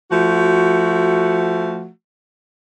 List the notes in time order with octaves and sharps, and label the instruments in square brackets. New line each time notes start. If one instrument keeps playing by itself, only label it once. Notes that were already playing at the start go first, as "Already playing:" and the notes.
[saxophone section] F3 A3 F#4